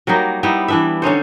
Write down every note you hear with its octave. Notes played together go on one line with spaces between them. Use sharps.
F#3 G3 A#3 D#4
G3 B3 D#4 E4
E3 D4 E5
D3 C#4 D#4 C5